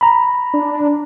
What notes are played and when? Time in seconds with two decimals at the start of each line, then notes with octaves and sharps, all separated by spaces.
0.01 A#5 B5
0.54 D4